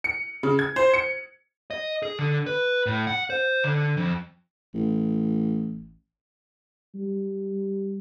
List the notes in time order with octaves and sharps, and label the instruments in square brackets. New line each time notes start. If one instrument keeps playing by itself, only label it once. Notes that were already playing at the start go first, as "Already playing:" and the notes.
[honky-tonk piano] C#7
C#3
G#6
C5
C#7
[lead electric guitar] D#5
G#4
D3
B4
A2
F#5
C5
D3
F2
[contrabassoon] A1
[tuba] G3